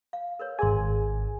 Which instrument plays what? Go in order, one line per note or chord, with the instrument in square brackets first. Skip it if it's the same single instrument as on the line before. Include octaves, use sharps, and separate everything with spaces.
[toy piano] F5
A#4 B4 C#5
[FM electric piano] G#1 G#5 [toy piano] G#4 A#4 C6